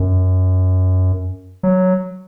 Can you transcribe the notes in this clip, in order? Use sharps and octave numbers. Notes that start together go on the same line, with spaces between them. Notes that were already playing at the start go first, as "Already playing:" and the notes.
Already playing: F#2
F#3